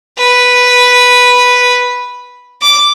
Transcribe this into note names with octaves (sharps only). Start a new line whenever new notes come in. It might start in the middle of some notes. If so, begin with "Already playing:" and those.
B4
D6